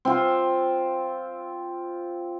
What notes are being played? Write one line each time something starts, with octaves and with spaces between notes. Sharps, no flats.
C4 F4